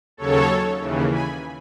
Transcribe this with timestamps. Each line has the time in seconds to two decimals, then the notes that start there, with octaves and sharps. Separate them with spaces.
0.17 D#2 C#3 F#3 A4 C#5
0.80 D#2 C#3 E3
1.11 G#5 B5